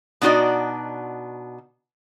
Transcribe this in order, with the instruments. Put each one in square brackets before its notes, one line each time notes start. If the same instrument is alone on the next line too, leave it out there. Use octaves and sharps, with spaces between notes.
[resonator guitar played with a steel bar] B2 D4 D#4 F#4 D5